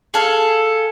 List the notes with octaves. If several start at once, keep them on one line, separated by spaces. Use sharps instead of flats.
G#4 A4 F5